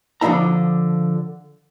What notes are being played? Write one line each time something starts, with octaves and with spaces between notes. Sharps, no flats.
D3 F3 C4 D4 E4 A#5